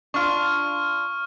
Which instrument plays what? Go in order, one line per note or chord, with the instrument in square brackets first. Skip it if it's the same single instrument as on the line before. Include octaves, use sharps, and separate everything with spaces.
[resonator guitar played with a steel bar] D4 F4 [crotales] C#6 F6